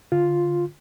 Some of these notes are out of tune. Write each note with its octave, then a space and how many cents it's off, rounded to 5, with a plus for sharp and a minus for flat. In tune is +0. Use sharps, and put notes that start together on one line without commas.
D3 +0 F4 +0